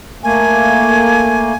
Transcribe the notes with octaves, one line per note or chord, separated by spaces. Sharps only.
A3 A#3 G#5